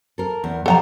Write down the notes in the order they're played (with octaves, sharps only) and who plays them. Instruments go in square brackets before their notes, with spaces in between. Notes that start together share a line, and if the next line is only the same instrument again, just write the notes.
[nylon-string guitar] A4 A#4
E2
[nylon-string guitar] B2 F3 [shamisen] A4 F#5 A#5